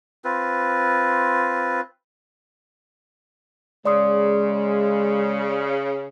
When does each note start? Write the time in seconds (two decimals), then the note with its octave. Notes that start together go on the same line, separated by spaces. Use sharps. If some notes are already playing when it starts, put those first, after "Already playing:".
0.24 C4 F4 B4
3.85 C#3 G#3 D5 C6 D#6